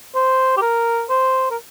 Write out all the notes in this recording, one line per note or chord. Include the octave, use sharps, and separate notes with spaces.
C5
G4
A#4
C5
A#4